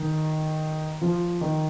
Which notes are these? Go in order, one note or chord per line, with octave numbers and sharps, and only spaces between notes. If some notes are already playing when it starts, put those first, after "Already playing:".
Already playing: D#3
F3
D#3